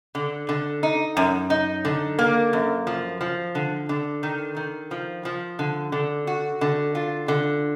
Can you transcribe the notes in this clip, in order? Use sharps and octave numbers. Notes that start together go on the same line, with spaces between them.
D3
D3
D#4
F#2
D#4
D3
A#3
F#2
F3
F3
D3
D3
D#3
D#3
F3
F3
D3
D3
F#4
D3
F4
D3